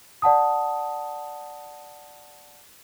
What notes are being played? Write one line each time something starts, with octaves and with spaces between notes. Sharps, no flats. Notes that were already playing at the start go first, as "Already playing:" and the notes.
D5 F#5 A5 D#6